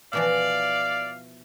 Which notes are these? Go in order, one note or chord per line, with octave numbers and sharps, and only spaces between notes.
B2 E3 F3 D5 F5